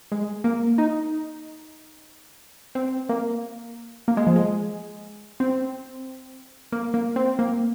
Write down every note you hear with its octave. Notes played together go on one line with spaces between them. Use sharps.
G#3
A#3
D#4
C4
A#3
A#3
G#3
F3
G#3
C4
A#3
A#3
C4
A#3